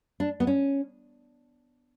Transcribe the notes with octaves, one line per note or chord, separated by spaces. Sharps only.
D4
B3
C#4